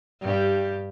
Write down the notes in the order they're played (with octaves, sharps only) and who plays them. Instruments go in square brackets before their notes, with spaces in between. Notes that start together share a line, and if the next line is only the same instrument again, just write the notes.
[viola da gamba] G2 G4